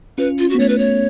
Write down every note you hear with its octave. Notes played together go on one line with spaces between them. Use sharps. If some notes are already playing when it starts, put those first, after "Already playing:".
C#4 F4 B4
F4
F#4
B3
A3 C#4 C#5
B4
C#5